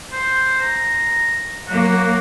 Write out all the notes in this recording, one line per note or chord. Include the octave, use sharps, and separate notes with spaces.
C5
A#5
F#3 A#3 F#4